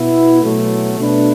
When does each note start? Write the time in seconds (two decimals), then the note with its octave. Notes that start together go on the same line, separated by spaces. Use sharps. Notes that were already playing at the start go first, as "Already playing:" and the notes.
Already playing: B2 B3 E4
0.42 B2 F#3 A3
1.00 B2 A3 D4 B4